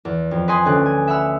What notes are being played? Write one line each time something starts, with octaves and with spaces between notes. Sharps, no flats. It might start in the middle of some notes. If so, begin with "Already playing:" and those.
E2
F2
B4 C5 D#5 G#5 C6 D#6
D2 C#4 F#6
G#5
E5 F#5 B5 E6 F6